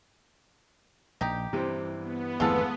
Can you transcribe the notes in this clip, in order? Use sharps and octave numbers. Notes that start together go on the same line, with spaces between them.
A#1 D#4 G4
G2 C3 E3 C4
B3
G#1 F2 E3 G#3 A3 F4 A4